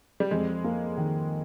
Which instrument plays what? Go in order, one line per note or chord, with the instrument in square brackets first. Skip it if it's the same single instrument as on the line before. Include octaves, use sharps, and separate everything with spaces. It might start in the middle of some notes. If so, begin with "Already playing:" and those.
[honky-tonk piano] G3
[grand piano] F2 [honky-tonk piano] G#3
[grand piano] A#3
D#3